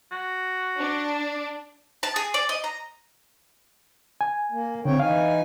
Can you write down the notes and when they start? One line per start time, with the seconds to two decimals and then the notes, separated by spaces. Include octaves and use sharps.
0.12 F#4
0.78 D4
2.03 A5
2.16 G#4
2.34 D5
2.49 D#5
2.64 A#5
4.21 G#5
4.52 A#3
4.85 D3 C4 C#5 G5
5.00 E3 D#4 F5 G#5